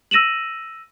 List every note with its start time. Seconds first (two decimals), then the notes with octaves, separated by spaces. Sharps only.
0.11 E6 A#6 D#7 E7 F#7